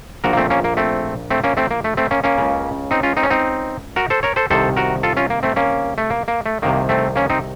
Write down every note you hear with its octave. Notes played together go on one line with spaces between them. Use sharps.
A#1 A#2 F#4 A#4
A#3
A3 C4
A#3 C#4
A#3
A3 C4
A3 C4
A#3 C#4
A3 C4
A#3
A3
A3 C4
A#3 C#4
A#3 C#4
C#2 C#3
C4 D#4
C#4 F4
C4 D#4
C#4
C4 D#4
F#4 A#4
A4 C5
A#4 C#5
A4 C5
C2 C3 D#3 A4 C5
F#4 A#4
F4 A4
C#4 F4
A#3
A3 C4
A#3 C#4
A3
A#3
A#3
A3
C2 C3 D#3 A#3
A3 C4
A#3 C#4
C4 D#4